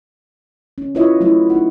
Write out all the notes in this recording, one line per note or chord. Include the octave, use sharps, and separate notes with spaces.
C#4
E4 F4 B4 C#5 D#5 E5
F#3 A3 E4
C#4 D#4 F#5